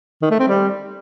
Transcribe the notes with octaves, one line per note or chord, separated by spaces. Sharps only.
D#3
A3
C4
G3